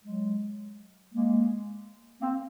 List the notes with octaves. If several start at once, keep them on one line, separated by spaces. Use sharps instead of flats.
F#3 G#3
G#3 A#3
A#3 C4